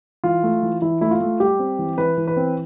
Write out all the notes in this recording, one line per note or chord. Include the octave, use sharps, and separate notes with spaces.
E3 F4
A3
E3
E3 E4
A3 E4
F4
A3
G3 G4
C4
E3
E3 B4
E3
B4
C4